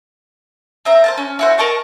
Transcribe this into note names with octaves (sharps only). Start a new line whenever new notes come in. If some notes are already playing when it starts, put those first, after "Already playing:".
C4 E5 A#5
C5 F5 A5
C#4
E4 F#4 C5
A#4 D#5 A5 C#6